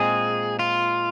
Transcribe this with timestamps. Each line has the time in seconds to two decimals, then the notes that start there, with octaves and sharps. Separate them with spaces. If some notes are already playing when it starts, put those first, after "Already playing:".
Already playing: A#2 G#3 C4 G#4
0.59 F4